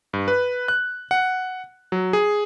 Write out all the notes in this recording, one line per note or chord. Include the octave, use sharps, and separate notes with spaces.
G2
B4
F#6
F#5
F#3
G#4